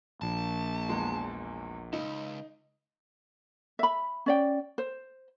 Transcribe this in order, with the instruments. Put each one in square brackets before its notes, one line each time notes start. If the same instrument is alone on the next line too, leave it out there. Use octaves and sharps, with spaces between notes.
[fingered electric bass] A#1 [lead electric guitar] A5
[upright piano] E2 G#3
[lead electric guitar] C#2 [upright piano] D#4
[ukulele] E5 B5
C#4 D5 G5
C5